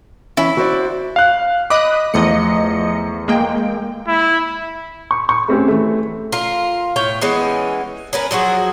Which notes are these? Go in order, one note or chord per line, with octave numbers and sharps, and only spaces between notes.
E3 C#4 E4
F#4 C5 D5
F5 F#6
D#5 B5 D6 D#6 F#6
E2 F3 A3 D#5 C#7
G#3 A#3 G5
E4
C#6
C#6
A3 C4 C#4 G4
E3 A3
F4 A#4
A2 A3 C#5 G5
E3 G#3 B3 C#4
C#4 A#4 B4
F3 F#3 F#4 G#4